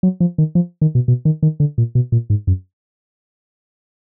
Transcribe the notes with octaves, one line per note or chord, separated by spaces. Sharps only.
F#3
F3
D#3
F3
D#3
B2
B2
D#3
D#3
D3
A#2
B2
A#2
G#2
F#2